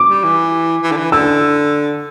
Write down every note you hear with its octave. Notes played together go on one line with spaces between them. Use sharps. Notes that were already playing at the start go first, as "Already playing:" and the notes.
Already playing: D6
G3
E3
E3
D3
E3
D3 E6